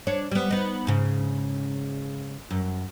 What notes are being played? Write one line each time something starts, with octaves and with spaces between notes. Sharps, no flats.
D4 C#5
G3 B3
B3 D#4
G#2 C#3
F#2